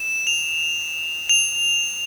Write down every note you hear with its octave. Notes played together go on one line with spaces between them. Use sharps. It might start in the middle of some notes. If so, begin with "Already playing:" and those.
Already playing: E7
F7
F7